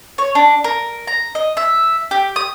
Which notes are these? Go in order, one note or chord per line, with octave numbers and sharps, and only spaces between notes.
C#5
D4
A#4
A#5
D#5
E5
G4
D#6